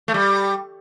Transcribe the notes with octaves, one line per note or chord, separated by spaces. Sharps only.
A3
G3